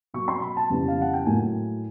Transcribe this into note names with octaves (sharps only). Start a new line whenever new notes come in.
B2 F#3 A#3 C#6
C6
B5
A5
F2 C#3 E3 G3 B3
F5
F#5
G5
A2 F#3 A#3 G#5